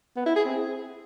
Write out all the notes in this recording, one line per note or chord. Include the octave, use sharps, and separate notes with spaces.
B3
E4
G#4
C4